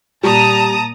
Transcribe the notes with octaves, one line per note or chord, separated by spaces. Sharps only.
A#2 G3 A5 A#5 D#6